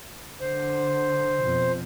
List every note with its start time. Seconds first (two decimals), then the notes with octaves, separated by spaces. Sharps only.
0.41 D3 C5
1.40 F2 B2